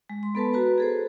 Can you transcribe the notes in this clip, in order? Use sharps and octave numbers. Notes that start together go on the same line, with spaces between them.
G#3
C6
B3 A4 B4 A5
F#4 B4 A#5
G#4 A4 C5